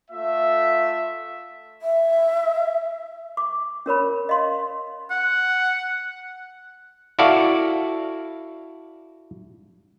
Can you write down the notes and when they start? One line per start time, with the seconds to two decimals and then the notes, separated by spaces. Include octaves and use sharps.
0.11 A3 F4 E5
1.82 E5
3.37 D6
3.86 C#4 A#4 C#5 B5
4.29 D#5 F5 C6
5.11 F#5
7.19 E4 F#4 A4 D5 F5